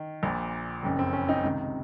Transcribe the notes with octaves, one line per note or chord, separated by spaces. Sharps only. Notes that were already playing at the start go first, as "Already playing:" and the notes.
Already playing: D#3
A#1 A#2
F#1 F2 C#3
C4
C#4
C4 D#4
C#2 C3 D#3